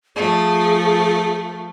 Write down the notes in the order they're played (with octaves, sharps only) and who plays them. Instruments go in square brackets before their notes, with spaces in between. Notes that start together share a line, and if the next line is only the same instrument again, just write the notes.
[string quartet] F3 A3 [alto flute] G#4